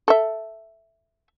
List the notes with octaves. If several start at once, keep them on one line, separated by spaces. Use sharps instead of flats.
A4 E5